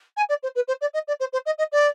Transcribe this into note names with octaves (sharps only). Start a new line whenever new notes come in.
G#5
D5
C5
B4
C5
D5
D#5
D5
C5
C5
D#5
D#5
D5